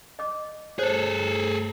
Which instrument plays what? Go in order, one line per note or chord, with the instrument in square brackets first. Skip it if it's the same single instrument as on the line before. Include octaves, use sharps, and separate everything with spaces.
[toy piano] D#5 D6
[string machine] G2 A3 A#5 [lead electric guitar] G#4 A4 [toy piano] C5 C#5